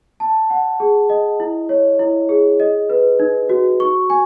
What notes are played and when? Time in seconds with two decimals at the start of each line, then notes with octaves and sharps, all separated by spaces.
0.20 A5
0.50 F#5
0.80 G#4
1.10 D#5
1.40 E4
1.69 C#5
1.99 E4
2.29 G#4
2.60 D#5
2.90 B4
3.20 D#4
3.49 F#4
3.80 C#6
4.10 G#5